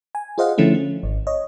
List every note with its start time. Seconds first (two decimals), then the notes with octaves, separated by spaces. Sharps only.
0.15 G#5
0.38 F4 G#4 C5 D#5 F5 F#5
0.58 D3 F3 A3 C#4 E4
0.74 C#4
1.03 G#1
1.27 C#5 D#5